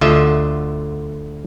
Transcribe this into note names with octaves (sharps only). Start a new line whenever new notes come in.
D2 D3 F4 D#5 E5